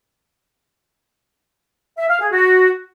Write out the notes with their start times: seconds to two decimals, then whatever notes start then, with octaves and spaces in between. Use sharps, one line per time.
1.98 E5
2.09 F5
2.20 G#4
2.32 F#4